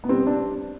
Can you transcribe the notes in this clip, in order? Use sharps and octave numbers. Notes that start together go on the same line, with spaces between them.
B3
G3 C4
D4